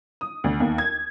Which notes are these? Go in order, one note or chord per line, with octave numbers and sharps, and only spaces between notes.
D#6
D2
D#2
G#6